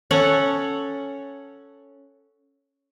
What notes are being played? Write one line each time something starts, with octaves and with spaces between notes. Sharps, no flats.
C#4 A4 C#5 F#5